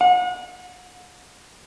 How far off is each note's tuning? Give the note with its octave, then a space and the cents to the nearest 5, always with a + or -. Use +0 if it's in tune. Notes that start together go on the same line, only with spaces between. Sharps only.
F#5 -35